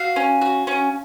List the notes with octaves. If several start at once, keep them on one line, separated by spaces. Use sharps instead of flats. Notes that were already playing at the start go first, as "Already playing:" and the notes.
Already playing: F#4 F5
C#4
F#4
C#4